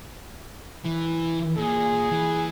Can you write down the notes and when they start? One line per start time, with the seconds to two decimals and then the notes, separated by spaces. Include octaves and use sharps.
0.85 E3
1.57 A#2 G#4
2.11 E3